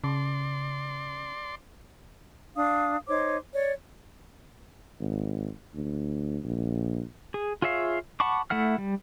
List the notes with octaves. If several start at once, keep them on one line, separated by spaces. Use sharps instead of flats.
C#3 D5 C6
D4 F5 D#6
D#4 C5 C#5 D6
C#5 D5
G#1
D2
A#1
G#4
F4 G#4 C#5 E5 F5
F#5 A5 B5 C#6 D6
A3 E4 F#5 F6
G3